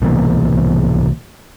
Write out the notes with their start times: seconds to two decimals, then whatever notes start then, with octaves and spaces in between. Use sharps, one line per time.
0.01 C2 B2 E3 A#3